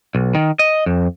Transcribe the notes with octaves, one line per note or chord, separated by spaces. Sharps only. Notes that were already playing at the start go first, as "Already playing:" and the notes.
B1
D#3
D#5
F2